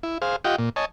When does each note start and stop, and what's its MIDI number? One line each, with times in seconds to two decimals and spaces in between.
0.03 0.18 64
0.22 0.36 68
0.22 0.36 72
0.22 0.36 77
0.44 0.56 65
0.44 0.56 67
0.44 0.56 75
0.44 0.56 78
0.44 0.56 79
0.58 0.69 46
0.76 0.85 73
0.76 0.85 75
0.76 0.85 80
0.76 0.85 81